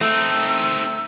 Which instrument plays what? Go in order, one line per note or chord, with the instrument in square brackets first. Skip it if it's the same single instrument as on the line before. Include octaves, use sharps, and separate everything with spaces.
[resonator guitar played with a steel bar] A3 [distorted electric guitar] C4 D#4 [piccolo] E6